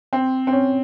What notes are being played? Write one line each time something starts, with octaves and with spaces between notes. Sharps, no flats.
C4
C4
C#4